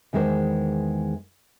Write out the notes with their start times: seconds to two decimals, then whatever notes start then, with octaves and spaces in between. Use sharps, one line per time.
0.13 E2 D#3 G#3 A#4 C5